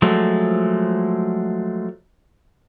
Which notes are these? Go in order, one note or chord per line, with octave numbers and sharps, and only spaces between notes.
F3 F#3 G#3 A3